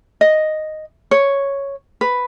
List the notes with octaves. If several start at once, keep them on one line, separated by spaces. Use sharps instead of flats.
D#5
C#5
B4